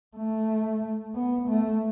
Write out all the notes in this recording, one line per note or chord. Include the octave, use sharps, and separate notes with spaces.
A3
B3
A3